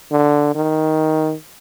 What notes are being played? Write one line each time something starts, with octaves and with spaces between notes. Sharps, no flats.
D3
D#3